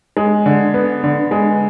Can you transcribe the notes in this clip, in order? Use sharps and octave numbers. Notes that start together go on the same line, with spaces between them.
G#3
D3
B3
D3
G#3